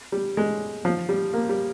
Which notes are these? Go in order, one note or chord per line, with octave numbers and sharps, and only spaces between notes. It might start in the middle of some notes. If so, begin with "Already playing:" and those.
G3
G#3
F3
G3
A#3
G3